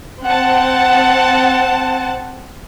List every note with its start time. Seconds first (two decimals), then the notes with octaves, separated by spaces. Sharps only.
0.24 C4 F#5 A5